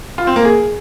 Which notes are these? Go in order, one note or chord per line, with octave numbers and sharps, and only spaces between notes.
F4
C4
A#3
G#4